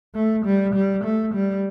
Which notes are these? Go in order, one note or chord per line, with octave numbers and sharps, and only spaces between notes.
A3
G3
G3
A3
G3